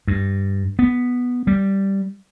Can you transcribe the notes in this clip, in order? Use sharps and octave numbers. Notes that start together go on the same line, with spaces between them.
G2
B3
G3